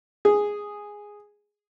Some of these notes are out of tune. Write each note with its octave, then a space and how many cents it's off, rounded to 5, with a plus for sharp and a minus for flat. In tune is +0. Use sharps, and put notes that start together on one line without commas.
G#4 -5